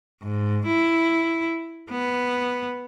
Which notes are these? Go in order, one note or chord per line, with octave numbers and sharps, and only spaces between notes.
G#2
E4
B3